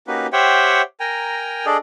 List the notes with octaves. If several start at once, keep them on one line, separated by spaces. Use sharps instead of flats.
A#3 C#4 D#4 F#4 G4 B4
G4 C5 C#5 E5 F#5 G5
A#4 G5 G#5 A#5
D4 G#4 A4 D5 D#5